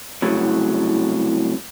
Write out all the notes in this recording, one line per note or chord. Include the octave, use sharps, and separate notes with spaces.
C2 A2 C#3 F#3